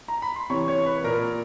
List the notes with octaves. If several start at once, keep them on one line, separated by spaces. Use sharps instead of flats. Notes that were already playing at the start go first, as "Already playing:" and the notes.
A#5
B5
C6
C3 E3 C#5 C#6
C#5 C#6
B4 B5
A#2 A#4 A#5